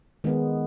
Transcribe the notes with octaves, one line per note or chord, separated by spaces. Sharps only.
D#3 G#3 B3